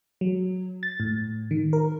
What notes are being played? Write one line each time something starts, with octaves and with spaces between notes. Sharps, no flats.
F#3
A6
A2
D#3
A#4